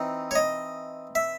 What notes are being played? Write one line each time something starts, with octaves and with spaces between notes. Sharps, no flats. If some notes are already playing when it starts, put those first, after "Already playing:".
Already playing: E3 C4 D#4
C#5
D#5
E5